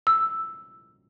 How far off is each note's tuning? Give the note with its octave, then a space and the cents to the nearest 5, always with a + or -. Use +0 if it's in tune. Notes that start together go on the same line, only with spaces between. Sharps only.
E6 +0